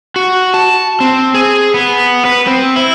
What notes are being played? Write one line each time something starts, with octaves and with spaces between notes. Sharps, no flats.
F#4
A5
C4
G#4
B3
B4
C4
E4